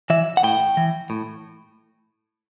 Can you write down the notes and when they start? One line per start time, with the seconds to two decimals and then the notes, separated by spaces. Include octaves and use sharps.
0.10 E3 E5
0.37 F#5
0.43 A2 G5
0.77 E3
1.10 A2